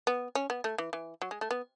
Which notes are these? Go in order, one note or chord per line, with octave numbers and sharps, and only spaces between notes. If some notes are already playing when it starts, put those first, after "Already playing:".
B3
C#4
B3
A3
E3
E3
F#3
G#3
A3
B3